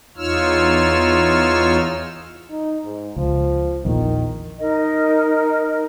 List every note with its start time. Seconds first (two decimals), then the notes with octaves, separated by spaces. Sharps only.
0.17 E2 D#4 F4 C#5 E6 F6
2.51 D#4
2.84 G#2
3.16 C#2 F3
3.85 A#1 E2 A#2 D#3
4.59 D#4 A#4 D#5